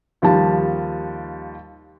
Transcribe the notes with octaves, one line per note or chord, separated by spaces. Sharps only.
D#2 F3 G3 A5